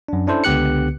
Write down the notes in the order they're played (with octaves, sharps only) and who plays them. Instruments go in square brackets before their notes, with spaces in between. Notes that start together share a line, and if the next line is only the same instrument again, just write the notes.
[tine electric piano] F#2 D4
C#4 D4 E4 A4 C5
C#2 D3 B3 G4 F#6 C#7